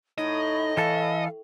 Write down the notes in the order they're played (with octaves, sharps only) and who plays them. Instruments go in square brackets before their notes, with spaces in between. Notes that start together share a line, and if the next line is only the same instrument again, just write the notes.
[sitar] A2 [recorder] D#4 [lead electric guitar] D#5
[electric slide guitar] E3 A4 [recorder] F5